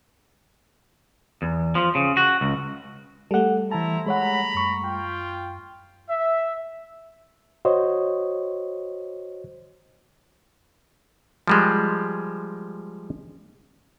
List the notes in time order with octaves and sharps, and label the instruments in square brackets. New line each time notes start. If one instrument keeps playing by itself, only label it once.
[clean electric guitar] E2
F3
C#3
F#4
C#2
[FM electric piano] G3 A3 [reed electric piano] A4 F#5
[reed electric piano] E3 A5 [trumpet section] E4 C5 A#5
[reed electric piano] G#3 C#5 F#5 [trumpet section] A#5 B5
[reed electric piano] F#2 C#6
[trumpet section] F4 G5
[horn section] E5
[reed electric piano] F#4 C5 C#5 D#5
[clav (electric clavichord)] F3 G3 G#3